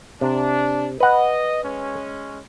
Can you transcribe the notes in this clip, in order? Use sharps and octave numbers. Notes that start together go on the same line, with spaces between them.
C3 D4
B4 D#5 F#5
G#3 C#4